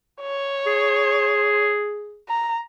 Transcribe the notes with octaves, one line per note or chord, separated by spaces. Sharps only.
C#5
G#4
A#5